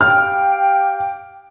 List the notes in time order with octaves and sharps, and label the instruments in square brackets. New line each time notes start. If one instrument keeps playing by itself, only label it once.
[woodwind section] G4 F5 G5 [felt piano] F6